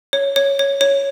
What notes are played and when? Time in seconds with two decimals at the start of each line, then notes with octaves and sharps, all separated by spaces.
0.13 C#5
0.36 C#5
0.59 C#5
0.81 C#5